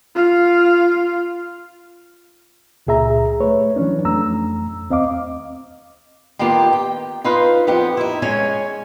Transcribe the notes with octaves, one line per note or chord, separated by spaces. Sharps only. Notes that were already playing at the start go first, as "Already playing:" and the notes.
F4 F5
C#2 A#2 G#4 E5 A#5
A3 B4 C#5
E3 F#3 C#4 D4
F2 A3 A#5 E6
D#2 C4 D#5 F5 D6
D#3 A#3 B3 F4 G4
G5
D#4 F4 B4 C5 F5
F2 B3 G4 F#5
D#4 E4
G#3 C#4 C#5 G#5